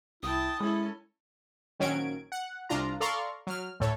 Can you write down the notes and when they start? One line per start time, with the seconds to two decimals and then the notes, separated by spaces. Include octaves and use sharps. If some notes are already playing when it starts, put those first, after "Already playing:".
0.23 C2 E4 G5 A5 D#6
0.60 G#3 C#4 E4 A4
1.80 A#1 D#3 F#3 C#4 G#6 D7
2.32 F#5
2.69 C2 D4 F4 A#5
3.00 A4 D5 F5 A#5 C6 C#6
3.47 F#3 F6
3.80 D2 A2 A4 C#5